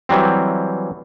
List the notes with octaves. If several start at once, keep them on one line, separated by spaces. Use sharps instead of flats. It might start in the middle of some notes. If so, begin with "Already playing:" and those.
E3 F#3 G3 C4